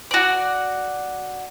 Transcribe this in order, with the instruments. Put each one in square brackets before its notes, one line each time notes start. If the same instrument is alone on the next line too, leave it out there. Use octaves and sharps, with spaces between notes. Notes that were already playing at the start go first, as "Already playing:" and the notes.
[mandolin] F#4 D5